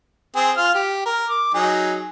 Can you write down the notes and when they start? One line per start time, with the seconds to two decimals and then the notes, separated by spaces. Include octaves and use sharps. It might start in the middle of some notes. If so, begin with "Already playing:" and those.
0.36 C4 G#4
0.57 F4 F6
0.75 G4
1.06 A#4
1.29 D6
1.54 F#3 D#4 G#4